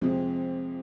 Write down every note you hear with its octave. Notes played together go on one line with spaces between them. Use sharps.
F2 C3 F3 G#3 C4